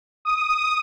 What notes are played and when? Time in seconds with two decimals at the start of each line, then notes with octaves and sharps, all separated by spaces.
0.25 D#6